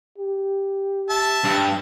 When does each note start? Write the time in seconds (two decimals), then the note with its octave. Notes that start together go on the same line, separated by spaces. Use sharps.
0.18 G4
1.10 E5 A5
1.44 G2